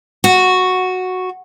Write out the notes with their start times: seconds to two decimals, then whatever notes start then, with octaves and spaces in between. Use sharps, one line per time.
0.24 F#4